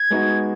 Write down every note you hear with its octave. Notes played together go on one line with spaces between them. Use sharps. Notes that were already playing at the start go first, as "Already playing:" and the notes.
Already playing: G#6
G#3 B3 D#4 F#4